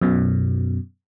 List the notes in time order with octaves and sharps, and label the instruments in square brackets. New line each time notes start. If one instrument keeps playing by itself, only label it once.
[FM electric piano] F#2 B2